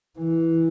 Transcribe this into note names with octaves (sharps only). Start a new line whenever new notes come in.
E3